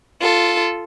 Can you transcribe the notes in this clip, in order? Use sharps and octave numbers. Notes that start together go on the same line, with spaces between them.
F4 A4